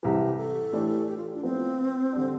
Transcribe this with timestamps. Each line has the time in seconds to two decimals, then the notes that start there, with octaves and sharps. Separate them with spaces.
0.03 C2 C3 E3 G4
0.38 A4
0.73 A2 E3 A3 D4 G4
1.08 G4
1.17 F4
1.34 D4
1.43 A2 F3 B3 C4
2.13 D3 G3 D4